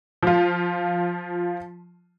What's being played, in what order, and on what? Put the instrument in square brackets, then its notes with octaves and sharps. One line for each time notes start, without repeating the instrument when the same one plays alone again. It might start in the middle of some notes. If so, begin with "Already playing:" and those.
[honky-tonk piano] F3 F4